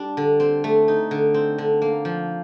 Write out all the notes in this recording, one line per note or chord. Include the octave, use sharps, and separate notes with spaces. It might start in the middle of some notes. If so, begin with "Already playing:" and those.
Already playing: G3 D4
D3
C4
A3
D#4
D3
C4
D3
A#3
F3